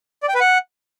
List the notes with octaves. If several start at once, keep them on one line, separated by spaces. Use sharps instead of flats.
D5
G5
B4
F#5